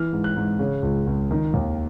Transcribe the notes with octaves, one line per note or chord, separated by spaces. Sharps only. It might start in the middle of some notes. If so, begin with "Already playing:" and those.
Already playing: E3 F6
G#2
F#6
G#2
C#3
C#2
C#2
D#3
D#2